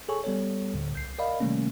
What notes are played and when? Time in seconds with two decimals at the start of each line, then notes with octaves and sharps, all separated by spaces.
0.09 G#4 A4 C#5 G#5 C#6
0.24 G3 B3 A4 C#5
0.74 D2 A2 D3
0.93 C2 G6 C7
1.18 A#4 D5 D#5 F5 B5
1.40 C3 D#3 G3 A3 A#3 C#4